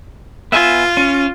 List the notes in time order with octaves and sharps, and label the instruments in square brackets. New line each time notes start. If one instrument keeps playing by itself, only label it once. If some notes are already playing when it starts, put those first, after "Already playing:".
[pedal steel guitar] B3 E5 G#5 [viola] F4
[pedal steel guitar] C#4